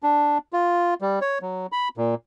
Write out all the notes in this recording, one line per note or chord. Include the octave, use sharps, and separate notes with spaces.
D4
F4
G3
C#5
F#3
B5
A#2